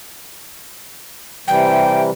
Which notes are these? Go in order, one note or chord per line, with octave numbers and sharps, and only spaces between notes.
C3 E3 G3 G5